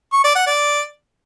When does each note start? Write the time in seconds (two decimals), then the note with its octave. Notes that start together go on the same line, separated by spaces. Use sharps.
0.13 C#6
0.24 D5
0.35 F#5
0.46 D5